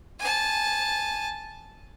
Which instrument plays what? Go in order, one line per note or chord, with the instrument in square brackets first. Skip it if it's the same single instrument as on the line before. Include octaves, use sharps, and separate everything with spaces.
[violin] G#5 A5